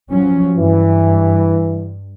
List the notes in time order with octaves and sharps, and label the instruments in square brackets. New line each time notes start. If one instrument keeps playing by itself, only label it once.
[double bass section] F3 F#3 C#4
[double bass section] G2 [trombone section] E3